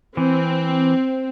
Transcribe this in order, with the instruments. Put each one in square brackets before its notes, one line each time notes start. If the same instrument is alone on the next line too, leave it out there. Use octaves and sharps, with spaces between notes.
[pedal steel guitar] E3 [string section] C4